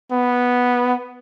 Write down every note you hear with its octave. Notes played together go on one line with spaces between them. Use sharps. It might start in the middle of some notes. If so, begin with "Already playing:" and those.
B3